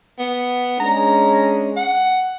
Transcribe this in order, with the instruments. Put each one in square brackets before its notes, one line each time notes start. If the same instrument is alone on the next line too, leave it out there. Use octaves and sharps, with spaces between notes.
[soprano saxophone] B3
[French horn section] G#3 C#4 D4 [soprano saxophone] A#5
[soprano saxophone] F#5